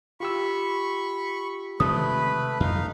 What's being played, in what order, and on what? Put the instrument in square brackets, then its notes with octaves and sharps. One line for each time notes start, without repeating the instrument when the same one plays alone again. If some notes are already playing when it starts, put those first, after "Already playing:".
[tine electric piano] F4 G4 E6 [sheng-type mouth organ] B5 C#6
[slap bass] C3 D#3 G#3 [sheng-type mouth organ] A3 B4 B5 [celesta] D#6
[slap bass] F2 [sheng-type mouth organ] D#4 F5